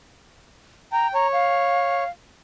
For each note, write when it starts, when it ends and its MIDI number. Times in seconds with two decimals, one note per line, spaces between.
0.92 1.14 79
0.92 1.07 82
1.14 2.04 73
1.14 1.27 82
1.32 2.09 77